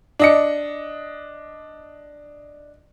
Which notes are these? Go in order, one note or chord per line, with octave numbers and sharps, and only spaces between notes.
D4 D#5 C#7